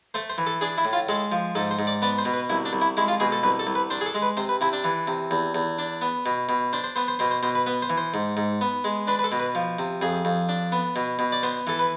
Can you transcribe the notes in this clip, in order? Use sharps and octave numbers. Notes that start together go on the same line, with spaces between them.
A3 C5
C5
E3
A4
D4 G#4
E4
A2
F4
G#3 A4
F3
G#2 A4
C5
G#2
D5
B3 D5
C5
B2
B4
C2 E4
D4
C2
E4
G#3 E4
F4
B2 G#4
A4
C2 B4
A4
C2
B4
D4 C5
G#4
A4
G#3
B4
C3 C5
B4
C3 E4
D4
E3
C3
E2
E2
D4
B3
B2
B2
D4 C5
C5
B3 C5
C5
B2 C5
C5
B2 C5
B4
B3 B4
C5
E3
C5
G#2
G#2
B3
G#3
D4 B4
B4
A4
B2
B4
F3
C3
F2 G#4
F2
D4
B3
B2
B2
D5
B3 C5
E3 A4
B4